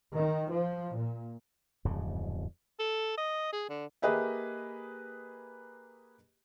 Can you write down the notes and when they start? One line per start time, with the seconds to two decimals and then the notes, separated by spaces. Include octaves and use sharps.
0.15 D#3
0.51 F3
0.95 A#2
1.85 D1 F2 G#2 C#3
2.80 A4
3.17 D#5
3.53 G#4
3.69 D3
4.02 A#3 G4 G#4 B4 D#5 E5